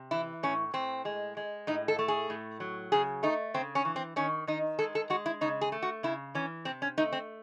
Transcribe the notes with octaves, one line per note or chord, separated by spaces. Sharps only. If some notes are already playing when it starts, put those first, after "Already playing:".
Already playing: C3
E3 E4
A2 C#4
A2 C4
G#3
G#3
A2 D#4
A4
A3
G#4
A2
F#3
C#3 G#4
A3 D#4
C#3 C4
C#4
E3
C4
D#3 C#4
D#3 D#4
G#3 A4
A4
G#3 F#4
E4
C#3 D#4
G#4
A3
F#4
C#3 E4
E3 C#4
C3 C4
C#4
A3 D#4
C4